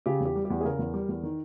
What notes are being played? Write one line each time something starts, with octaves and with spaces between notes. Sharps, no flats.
C#3 G4
E2
G4
G3
G4
E2
G#4
C#3 A#4
E2
G3
E2
D#3